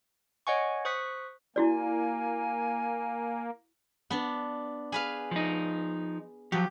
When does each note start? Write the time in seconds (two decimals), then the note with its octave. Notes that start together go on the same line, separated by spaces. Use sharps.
0.47 C#5 D#5 F#5 G#5 C#6
0.85 C5 C#6 D#6 F#6 B6
1.56 A#3 E4 F#4 D5 G#5
4.10 B3 D4
4.92 G#4 B4 F5
5.31 F3 D#4
6.52 F3 F#3 G4